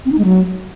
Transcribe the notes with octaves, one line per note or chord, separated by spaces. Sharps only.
C4
D#4
G#3
F#3